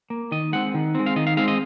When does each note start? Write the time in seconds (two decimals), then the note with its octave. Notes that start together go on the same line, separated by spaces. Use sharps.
0.10 A#3
0.32 D#3 D#5
0.53 G#3 C4 F#5
0.74 D#3
0.95 G#3 C4
1.06 F5
1.16 D#3 D#5
1.27 F5
1.37 G#3 C4 F5
1.48 D#5